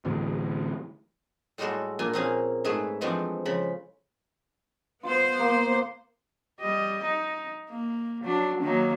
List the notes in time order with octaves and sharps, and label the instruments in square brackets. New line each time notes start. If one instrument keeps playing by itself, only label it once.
[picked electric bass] D1 D2 A2 E3
[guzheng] A2 G3 G#3 F#4 A4 C6
A#2 A#3 D4 G#5
A#2 A#3 C4 C#4 G#4 F5
G#2 A3 G#4 B4 A5
E3 F3 G#3 A3 C4 D4
C#3 F3 B5
[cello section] B3 C5 [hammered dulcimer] F4
[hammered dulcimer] A#3
[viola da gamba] G3 D#5
D#4
A#3
F#3 D4
D#3 F#3 A#3